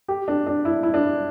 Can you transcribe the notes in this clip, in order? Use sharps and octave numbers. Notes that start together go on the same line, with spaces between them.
G4
D4
D4
E4
E4
D4